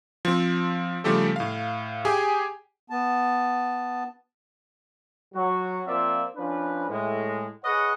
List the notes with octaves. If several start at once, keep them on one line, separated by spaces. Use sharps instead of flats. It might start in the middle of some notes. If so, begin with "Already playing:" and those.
F3 C4
C#3 F3 G3 A3 G4 A4
A2 F5
G4 G#4 G5 G#5
B3 A5
F#3 F#4
F3 A#3 C4 F4 D5 E5
F3 C#4 D4 B4
A2 G#3
G#4 B4 C#5 D#5 F#5